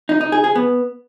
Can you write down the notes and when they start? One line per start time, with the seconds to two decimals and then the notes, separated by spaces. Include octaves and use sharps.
0.09 D#4
0.21 D#4
0.32 G#4
0.44 G#4
0.55 B3